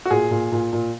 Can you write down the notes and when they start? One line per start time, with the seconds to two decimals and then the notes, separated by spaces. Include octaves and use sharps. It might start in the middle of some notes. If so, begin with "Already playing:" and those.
0.05 F#4
0.11 A#2 G#4
0.31 A#2
0.52 A#2
0.73 A#2